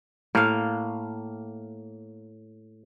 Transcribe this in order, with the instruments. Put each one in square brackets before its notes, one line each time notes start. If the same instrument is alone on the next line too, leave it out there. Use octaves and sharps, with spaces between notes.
[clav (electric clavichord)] A2 [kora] A#3 F5